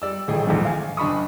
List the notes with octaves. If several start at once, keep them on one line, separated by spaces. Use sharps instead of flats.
G3 D5 E6
D#1 A1 A2 G#4 G5
A#1 E2 G#2
F5 G#5
F#1 D4 B5 C#6 D#6